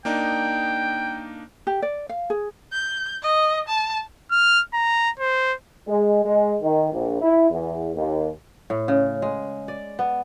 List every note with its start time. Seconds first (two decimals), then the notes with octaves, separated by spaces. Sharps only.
0.05 A#3 D4 D#4 G5
1.67 G4
1.82 D5
2.09 F5
2.30 G#4
2.72 G6
3.22 D#5
3.68 A5
4.31 F6
4.74 A#5
5.20 C5
5.88 G#3
6.25 G#3
6.61 D#3
6.92 A#1
7.22 E4
7.51 E2
7.95 D#2
8.70 A2
8.88 C#3
9.22 G#3
9.68 D5
9.99 B3